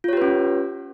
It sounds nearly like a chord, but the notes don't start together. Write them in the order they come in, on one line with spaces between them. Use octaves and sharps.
F4 C#5 G4 B4 C#4